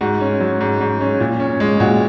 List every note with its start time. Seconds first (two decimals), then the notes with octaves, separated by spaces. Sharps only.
0.01 G#2 F#4
0.21 C#4
0.40 F#3
0.61 G#2
0.81 G#2
1.01 C#4
1.20 A#2
1.40 C#4
1.60 G#3
1.80 A#2 F#4